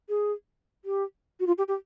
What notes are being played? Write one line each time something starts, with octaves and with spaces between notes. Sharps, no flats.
G#4
G4
F#4
F4
G4
G4